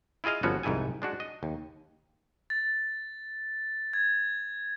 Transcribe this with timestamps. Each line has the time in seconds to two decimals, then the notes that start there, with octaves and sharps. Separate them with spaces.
0.24 E4 F4 G#4 D#5 F5
0.43 G1 F3 B3 C#4 F#4
0.63 C2 F2 G#2 E4 A4 G#5
1.02 G#3 D4 F#4
1.20 D#5
1.43 D#2
2.50 A6
3.93 G#6